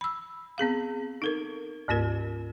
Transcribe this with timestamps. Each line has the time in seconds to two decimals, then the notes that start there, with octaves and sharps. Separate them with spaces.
0.01 B5 E6
0.58 B3 C4 G#4 F5
1.22 D#4 A4 A#4
1.88 D2 G#2 A#3 F4 A#4